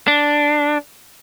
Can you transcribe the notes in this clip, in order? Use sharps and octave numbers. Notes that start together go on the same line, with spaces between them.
D4